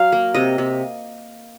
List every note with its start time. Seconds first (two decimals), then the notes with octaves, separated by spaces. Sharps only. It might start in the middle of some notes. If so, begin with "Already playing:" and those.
Already playing: F#3 F5
0.12 A#3
0.34 C3 D#5
0.58 C3